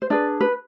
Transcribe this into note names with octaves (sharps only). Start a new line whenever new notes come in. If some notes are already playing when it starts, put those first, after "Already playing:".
C5
D4 G#4 B4 D5
B4